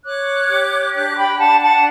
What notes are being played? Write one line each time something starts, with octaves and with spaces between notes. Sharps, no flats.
C#5 D6 F#6
G4
D4 D6 F#6
G5 B5
D4 F#5 A5
F#5 A5